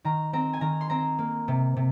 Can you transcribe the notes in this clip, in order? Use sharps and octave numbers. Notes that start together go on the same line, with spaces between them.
D#3 A#5
C4 A#5
G#5
D#3 A#5
C6
C4 A#5
A#3
C3
C3